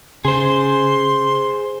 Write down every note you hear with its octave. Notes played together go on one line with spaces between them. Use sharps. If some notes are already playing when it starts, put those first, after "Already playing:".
C#3 G#4 C5 C6